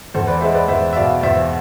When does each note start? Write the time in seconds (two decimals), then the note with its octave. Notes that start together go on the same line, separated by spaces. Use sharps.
0.14 E2 A4 C5
0.27 B4 D5
0.41 G#3 C5 E5
0.55 B4 D5
0.68 E2 C5 E5
0.93 E5
0.96 B2 D5 F5
1.23 E2 C5 E5